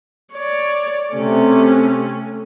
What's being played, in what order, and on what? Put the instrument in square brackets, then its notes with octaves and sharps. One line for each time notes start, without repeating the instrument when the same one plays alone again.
[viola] C#5 D5
[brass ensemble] C3 [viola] A3 C#4